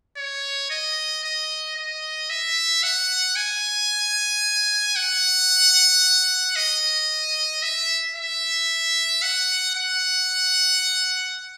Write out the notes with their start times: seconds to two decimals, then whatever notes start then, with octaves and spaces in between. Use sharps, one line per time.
0.17 C#5
0.70 D#5
1.23 D#5
1.76 D#5
2.30 E5
2.83 F#5
3.36 G#5
4.96 F#5
6.56 D#5
7.62 E5
8.16 E5
9.22 F#5
9.76 F#5